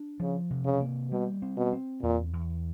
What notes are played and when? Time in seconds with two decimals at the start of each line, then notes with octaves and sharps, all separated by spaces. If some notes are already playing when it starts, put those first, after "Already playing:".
Already playing: D4
0.20 C#3 F3
0.50 C3
0.65 C#3
0.81 A#3
1.11 B2 G3
1.42 C4
1.57 B2
1.73 C4
2.02 E2 A#2
2.33 E2